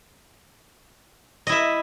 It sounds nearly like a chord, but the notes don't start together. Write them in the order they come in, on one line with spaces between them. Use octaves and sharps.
D#5 E4 E5